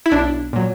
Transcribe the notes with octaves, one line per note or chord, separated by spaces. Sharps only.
E4
B1 D4
A#2 F#3